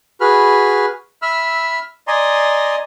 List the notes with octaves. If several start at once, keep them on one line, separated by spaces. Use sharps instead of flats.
F#4 G#4 B4 B5 F6
E5 B5 E6 F6
D5 D#5 G#5 A#5 C6